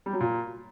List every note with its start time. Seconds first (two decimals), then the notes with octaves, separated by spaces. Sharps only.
0.06 G3
0.13 F#3
0.20 A#2